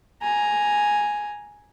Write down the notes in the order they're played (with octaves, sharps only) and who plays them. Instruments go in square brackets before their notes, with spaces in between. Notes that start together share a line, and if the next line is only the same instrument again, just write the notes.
[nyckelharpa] G#5 A#5